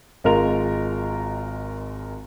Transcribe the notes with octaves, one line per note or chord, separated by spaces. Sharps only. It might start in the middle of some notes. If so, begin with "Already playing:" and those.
G#1 G#3 F4 A#4 F7